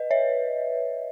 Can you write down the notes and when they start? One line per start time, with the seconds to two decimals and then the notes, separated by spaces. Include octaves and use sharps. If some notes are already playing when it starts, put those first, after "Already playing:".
Already playing: B4 D#5
0.11 C#5 E5